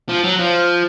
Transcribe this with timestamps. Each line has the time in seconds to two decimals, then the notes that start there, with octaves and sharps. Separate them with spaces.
0.09 F3
0.24 F#3
0.39 F3